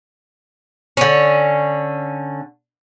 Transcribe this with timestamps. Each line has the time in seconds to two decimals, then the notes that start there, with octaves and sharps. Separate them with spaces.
0.97 D3 C#4